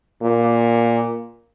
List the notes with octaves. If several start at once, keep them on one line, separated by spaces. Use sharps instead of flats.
A#2